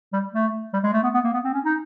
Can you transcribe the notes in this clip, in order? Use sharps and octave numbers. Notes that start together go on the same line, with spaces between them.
G3
A3
G3
G#3
A3
B3
B3
A#3
B3
C4
C#4
D#4